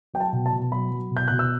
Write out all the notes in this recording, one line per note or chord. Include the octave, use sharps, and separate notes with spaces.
F#3 G5
A5
B2
A5
B2
F#3 B5
F#3
B2
G6
B2 F#6
E6